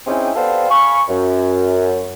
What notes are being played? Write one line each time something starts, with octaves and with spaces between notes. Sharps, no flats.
C4 C#4 D#4 E4 G#4 G5
B3 G4 A4 C5 D5 F5
F5 G#5 B5 C#6
F#2